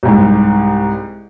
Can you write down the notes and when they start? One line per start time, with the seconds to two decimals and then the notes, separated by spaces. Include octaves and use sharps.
0.03 C2 G#2